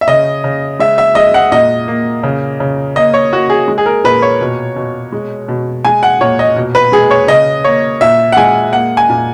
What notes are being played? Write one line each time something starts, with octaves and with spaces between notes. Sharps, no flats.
E5
C#3 D#5
C#3
G#3 E5
E5
G#3 D#5
F#5
A#2 D#5
A#3
C#3
C#3
A#3 D#5
C#5
A#3 F#4
G#4
G#3
G#4
A#4
A#2 B4
C#5
B2
B2
G#3
B2
G#3 G#5
F#5
A#2 C#5
D#5
B2
B4
G#3 G#4
C#5
C#3 D#5
A#3 C#5
A#2 E5
F#5
G#3 G#5
A#3 F#5
G#5
A#2